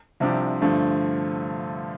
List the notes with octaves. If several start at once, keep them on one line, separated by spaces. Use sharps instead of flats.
C2 C3 F3 D4 G4
G2 D3 F3 A3